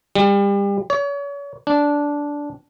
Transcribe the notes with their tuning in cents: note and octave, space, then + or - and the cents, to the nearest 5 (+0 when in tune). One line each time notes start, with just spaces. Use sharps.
G3 +35
C#5 +35
D4 -10